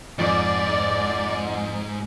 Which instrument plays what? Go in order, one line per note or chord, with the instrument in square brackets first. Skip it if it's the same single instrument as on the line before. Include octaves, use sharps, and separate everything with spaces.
[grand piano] F2 D6 [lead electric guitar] G#2 [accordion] D5